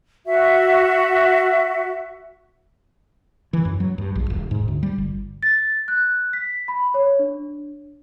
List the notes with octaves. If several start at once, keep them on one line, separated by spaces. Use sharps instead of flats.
F#4 E5
E3
F#2
F#3
G2
A#1
D#1
G#2
D2
G3
G1
A6
F#6
B6
B5
C#5
D4